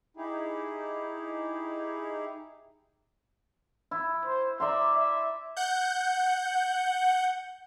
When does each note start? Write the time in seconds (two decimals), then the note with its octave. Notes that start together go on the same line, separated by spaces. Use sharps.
0.17 D#4 E4 G4 G#4
3.91 E4
4.26 C5
4.60 D5 E5 A#5 C6
4.98 E5
5.57 F#5 G6